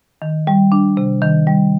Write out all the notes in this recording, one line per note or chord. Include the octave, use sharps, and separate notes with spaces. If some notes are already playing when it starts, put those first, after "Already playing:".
D#3
G3
D4
C3
D#3
G3